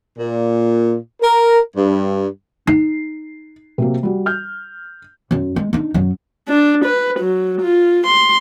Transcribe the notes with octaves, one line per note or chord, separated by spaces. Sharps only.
A#2
A#4
G2
D#4 C7
C3 F#3 A#3
G3 F#4
F6 G6
F#2 F#3
G#3
D4 D#4
F#2 F#3
D4
B4
F#3
F4
C6